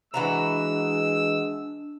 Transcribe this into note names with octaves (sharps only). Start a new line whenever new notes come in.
E3 G#3 D4 F#4 A#5 E6